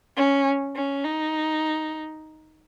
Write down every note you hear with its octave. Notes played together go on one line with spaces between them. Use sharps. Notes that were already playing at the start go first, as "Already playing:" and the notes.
C#4
C#4
D#4